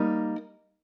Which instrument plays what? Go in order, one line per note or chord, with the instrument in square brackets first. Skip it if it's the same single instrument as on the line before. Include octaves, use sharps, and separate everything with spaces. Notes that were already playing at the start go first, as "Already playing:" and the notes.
Already playing: [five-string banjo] G3 A#3 D#4